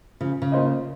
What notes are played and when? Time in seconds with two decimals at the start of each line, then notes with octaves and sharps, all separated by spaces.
0.21 C#3 F3
0.42 C#3
0.52 A#3 F4 C5 D#5